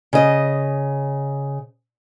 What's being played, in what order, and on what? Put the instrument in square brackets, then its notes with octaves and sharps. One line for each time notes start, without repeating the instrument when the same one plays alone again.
[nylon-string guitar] C#3 D#5